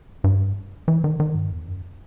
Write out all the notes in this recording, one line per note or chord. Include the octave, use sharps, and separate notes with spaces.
G2
E3
D#3
D#3
G2
E2
F#2